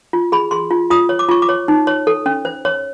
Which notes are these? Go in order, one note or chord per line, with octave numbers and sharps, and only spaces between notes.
F4
G#4 B5
G#4 C6
F4
F4 D#6
C#5
D6
F4 C#6
D6
C#5
D#4
C#5
A4
C#4
C5
C#5